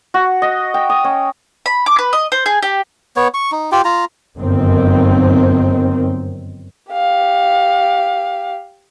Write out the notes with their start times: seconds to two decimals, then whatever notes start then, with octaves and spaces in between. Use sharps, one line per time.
0.14 F#4
0.42 D#5
0.74 G5
0.89 D#6
1.04 C#4
1.66 B5
1.86 D6
1.99 B4
2.13 D#5
2.32 C5
2.46 G#4
2.63 G4
3.17 B3 C#5
3.34 C#6
3.52 D#4
3.72 F4 G4 G5
3.85 F4 A#5
4.36 G1 F#2 D#3 C4
6.92 G4 F5